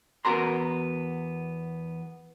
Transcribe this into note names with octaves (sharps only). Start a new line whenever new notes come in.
E2 B3 F#4 A#4 A#5 C6